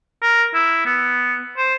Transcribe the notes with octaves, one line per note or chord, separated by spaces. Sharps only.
A#4
E4
B3
C5